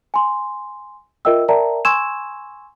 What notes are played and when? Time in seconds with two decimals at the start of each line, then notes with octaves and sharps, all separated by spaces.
0.14 G#5 C6
1.25 F4 A#4 D#5 E5 G5 E6
1.48 A#4 D5 E5 G5 A5 A#5
1.85 G#5 C6 C#6 E6 G#6 E7